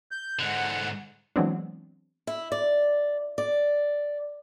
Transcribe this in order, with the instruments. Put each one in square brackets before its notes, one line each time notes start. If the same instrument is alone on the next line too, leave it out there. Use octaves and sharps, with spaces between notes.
[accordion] G6
[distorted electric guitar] G#2 D3 [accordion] F#5
[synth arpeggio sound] E3 F#3 G#3 B3 C4 D4
[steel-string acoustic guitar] E4
D5
D5